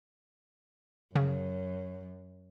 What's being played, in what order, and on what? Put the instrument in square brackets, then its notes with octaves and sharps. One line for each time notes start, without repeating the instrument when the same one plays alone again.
[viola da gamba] F#2 [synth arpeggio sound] C#3